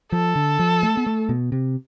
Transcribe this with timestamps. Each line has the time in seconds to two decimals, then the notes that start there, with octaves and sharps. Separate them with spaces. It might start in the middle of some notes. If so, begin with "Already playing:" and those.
0.12 F3 A4
0.36 D3
0.59 F3
0.83 A3
0.97 B3
1.06 A3
1.29 B2
1.52 C3